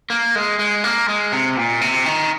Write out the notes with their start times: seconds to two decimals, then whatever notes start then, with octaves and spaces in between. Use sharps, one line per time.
0.10 A#3
0.35 G#3
0.59 G#3
0.84 A#3
1.08 G#3
1.32 C3
1.57 A#2
1.81 C3
2.06 D#3